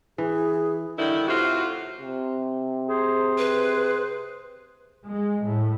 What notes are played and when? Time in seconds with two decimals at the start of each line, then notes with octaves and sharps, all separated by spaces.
0.18 E3 G#4
0.99 G2 D3 D#3 E4
1.28 A2 C3 F4 F#4
2.01 C3
2.89 G#4 C5
3.38 B4
5.06 G#3
5.44 A2